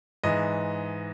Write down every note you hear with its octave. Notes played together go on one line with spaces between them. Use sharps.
G#2 E3 D#5